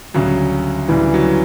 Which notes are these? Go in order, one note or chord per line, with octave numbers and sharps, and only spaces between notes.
D2 C#3 F#3 G3
D2 C#3 E3 G3
F#3